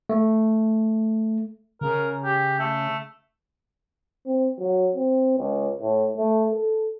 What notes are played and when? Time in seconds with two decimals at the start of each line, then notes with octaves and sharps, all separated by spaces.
0.09 A3
1.81 C#3 A#4
2.24 G4
2.59 A3
4.26 C4
4.59 F#3
4.95 C4
5.38 C#2
5.82 A2
6.17 A3
6.51 A4